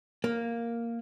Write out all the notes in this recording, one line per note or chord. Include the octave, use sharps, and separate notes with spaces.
A#3